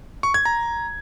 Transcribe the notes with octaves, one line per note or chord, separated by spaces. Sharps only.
C#6
G#6
A#5